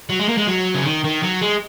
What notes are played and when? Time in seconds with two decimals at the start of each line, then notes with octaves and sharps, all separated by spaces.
0.09 F#3
0.19 G#3
0.28 A#3
0.38 G#3
0.47 F#3
0.75 C#3
0.85 D#3
1.04 D#3
1.23 F#3
1.42 G#3